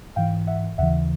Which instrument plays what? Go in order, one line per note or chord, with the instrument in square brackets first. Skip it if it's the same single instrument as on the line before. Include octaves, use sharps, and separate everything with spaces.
[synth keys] G#2 E3 F5 G5
E5 F#5
D#2 C#3 E3 E5 F#5